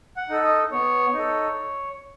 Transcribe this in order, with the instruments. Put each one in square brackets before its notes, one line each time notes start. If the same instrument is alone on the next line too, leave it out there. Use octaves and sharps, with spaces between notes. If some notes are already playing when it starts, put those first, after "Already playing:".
[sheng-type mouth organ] F#5
D#4 A4
D#5
B3 C#5
D#4 A4